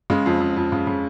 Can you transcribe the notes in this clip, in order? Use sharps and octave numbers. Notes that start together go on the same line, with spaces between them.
C#3 G#3
F2
F2
F2
C#3
C#3